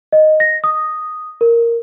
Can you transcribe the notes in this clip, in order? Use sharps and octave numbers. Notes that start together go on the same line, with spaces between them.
D#5
A#6
D#6
A#4